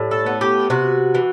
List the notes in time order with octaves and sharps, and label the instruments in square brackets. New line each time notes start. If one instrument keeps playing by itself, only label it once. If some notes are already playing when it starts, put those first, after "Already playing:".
Already playing: [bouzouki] A2 G3
A4
B3
G4
C3 F#4
E3